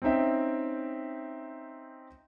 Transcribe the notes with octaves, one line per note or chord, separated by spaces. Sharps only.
C4 C#4 D#4 E5 G5